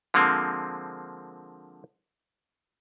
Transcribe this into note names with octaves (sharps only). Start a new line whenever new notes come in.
D3 F3 G#3 A#3 C4